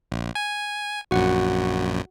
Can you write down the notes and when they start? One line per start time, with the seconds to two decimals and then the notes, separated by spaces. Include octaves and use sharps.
0.12 A#1
0.35 G#5
1.11 A#1 F#2 F#4 F#5